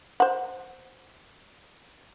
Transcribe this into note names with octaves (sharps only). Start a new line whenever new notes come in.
C5 F#5